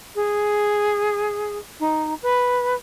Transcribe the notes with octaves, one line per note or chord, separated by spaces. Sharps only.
G#4
D#4
B4